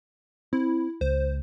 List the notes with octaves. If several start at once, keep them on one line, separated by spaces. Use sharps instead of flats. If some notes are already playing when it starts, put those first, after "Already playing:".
C4 E4
C#2 C5